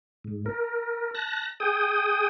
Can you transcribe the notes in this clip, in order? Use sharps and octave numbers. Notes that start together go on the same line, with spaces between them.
G#2
A#4
A5 F#6 A#6
G#4 G5 D#6